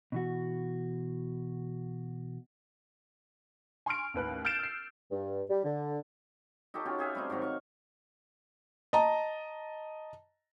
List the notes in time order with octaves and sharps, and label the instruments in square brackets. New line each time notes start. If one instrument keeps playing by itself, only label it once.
[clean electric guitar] B2 E3 F#4
[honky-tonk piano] G#5 C6 C#6 F6 D7
A1 D#2 B4 F#6
F6 G6 A6 C7 D7 E7
E6 C7
[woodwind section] G2
G3
D3
[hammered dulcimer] D#4 F#4 G4 A4
C#4 F4 G4
G4 G#4 E5 F5
G3 A3 C4 D#4
G#2 D#3 F#3 F5
F5 C#6
[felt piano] D#5 A5 A#5